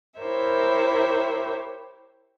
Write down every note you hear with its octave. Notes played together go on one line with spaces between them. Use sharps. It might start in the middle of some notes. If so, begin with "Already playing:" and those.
E4 G4 A#4 C5 C#5 E5